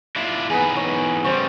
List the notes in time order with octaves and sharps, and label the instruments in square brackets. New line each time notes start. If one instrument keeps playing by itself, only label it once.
[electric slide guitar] D4 E4 F4
[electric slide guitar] E2 D#4 B4 [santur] B3 G#4
[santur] C#5
[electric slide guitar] C#3 G3 [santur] C5 C#6